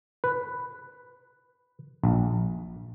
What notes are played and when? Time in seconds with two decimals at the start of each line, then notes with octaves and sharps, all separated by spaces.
0.24 B4
2.04 A#1